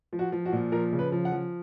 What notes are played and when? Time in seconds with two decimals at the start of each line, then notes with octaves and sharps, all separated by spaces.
0.13 F3
0.19 F#4
0.32 F3
0.46 F#4
0.52 A#2
0.72 F3 A#4
0.93 C#3
0.99 B4
1.12 F3
1.25 F#5
1.32 F3